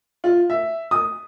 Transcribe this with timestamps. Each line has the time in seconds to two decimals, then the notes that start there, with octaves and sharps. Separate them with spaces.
0.24 F4
0.50 E5
0.91 D#6